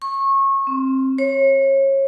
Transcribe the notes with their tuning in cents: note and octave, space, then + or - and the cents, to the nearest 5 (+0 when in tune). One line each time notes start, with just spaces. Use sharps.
C#6 -25
C4 +20
C#5 -30